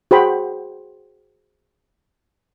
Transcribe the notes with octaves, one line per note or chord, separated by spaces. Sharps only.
F#4 G#4 C5 F#5 G5 B5